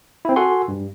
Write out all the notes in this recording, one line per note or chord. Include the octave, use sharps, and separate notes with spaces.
C4 E4
F#4 A4 F#5 G#5 C6
G2